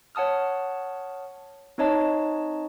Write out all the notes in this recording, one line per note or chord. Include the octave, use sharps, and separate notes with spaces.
C#5 F#5 A5 D#6 F6
C4 D#4 C#5 D#5 A5